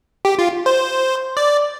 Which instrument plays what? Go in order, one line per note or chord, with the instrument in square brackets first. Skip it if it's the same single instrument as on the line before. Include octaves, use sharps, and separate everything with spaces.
[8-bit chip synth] G4
F4
C5
D5